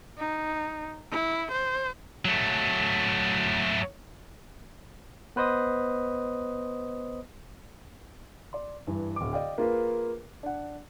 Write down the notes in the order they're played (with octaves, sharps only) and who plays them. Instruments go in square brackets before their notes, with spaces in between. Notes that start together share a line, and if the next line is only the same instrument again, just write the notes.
[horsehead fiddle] D#4
E4
C5
[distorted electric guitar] F#3 A3
[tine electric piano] B3 B4 C5 D#5 D#6
[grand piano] D5 C6
G2 E3
D1 D6
D5 D#5 F5 G5
A#3 F4 G#4 A#4 B4
D4 F#5